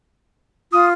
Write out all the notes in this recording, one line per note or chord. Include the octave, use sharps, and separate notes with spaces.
F4 D#6